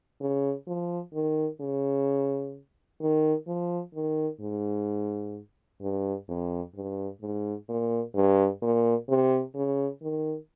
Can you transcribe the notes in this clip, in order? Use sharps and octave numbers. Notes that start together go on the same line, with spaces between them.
C#3
F3
D#3
C#3
D#3
F3
D#3
G#2
G2
F2
G2
G#2
A#2
G2
A#2
C3
C#3
D#3